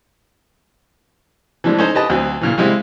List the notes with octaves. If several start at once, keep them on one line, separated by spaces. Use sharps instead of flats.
E3 F3 G#3 A3 D4
C#4 D#4 A4 C5
G4 B4 D#5 A5
D2 F#3 C4
A#2 C#3 E3
C#3 G3 G#3 C4 E4